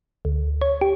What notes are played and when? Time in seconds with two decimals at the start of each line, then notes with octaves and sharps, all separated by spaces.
0.25 D2
0.62 C#5
0.81 G4